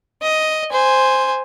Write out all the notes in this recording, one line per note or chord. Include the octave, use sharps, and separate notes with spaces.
D#5
C5 G#5